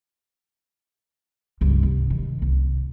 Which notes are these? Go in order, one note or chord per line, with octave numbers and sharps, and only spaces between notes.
C#2 G2
C2
D#3
C2